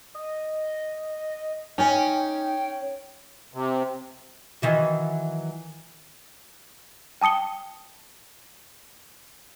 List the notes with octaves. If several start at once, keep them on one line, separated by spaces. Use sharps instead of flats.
D#5
C#4 D#4 D5 G5 G#5
C3
D#3 E3 F#3
G5 A5 D#6 C#7 G7